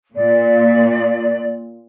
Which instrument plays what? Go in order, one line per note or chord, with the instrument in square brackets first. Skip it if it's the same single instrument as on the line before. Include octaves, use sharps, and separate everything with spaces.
[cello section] A#2 [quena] D5